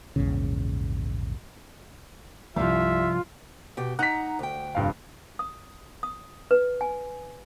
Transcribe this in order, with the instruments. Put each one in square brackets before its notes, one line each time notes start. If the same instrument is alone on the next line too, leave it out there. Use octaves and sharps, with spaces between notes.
[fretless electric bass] A#1 E2 G#2 C#3
[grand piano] C2 [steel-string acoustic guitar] G2 C3 F3 [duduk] F4 [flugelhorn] E5
[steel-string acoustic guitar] B2 G4
[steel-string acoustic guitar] D#4 F#5 A#5 [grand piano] F#6 B6
[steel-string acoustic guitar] D2 G5
[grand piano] F1 G2 F5
[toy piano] D#6
D#6
B4
G#5